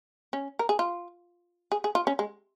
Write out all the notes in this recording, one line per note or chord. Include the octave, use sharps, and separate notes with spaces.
C#4
A#4
G#4
F4
G#4
G#4
F4
C#4
G#3